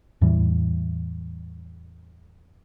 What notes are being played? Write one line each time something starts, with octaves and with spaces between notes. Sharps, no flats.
E2 A2 E3 G3